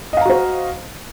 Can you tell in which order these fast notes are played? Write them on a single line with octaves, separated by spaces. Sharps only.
D#5 F5 A#5 F#4 C5